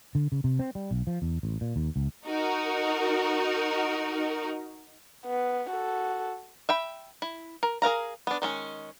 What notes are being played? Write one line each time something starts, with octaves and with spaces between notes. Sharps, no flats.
D3
C#3
C3
C4
G3
B1
F3
E2
A1
A#2
D#2
C#2
D#4 F#4 A#4
B3
F#4 A4
E5 G5 B5
E4
A#4
G#4 A#4 F5 A#5
B3 D4
D#3 G#3 C#4